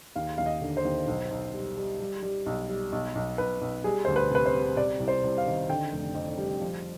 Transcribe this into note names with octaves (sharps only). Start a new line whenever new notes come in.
D#2 F5
D#2 F5
D#5
D3
C5
D#2
B1
B1
G3
G3
G3
G3
B1
G3
B1
B1
B1 B4
B1
G3 G#4
D2 C5
B4
C3 B4
C5
G3
C3 D5
C2
C5
C2
F5
D#3
D3 G5
F1
F2
G3
F3